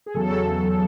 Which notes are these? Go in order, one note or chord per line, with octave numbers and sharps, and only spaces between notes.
G#4
E2 C#3 F#3 A4